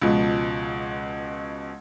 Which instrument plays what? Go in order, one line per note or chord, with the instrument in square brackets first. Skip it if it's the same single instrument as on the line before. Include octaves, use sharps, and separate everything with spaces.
[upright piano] C#2 B2 F3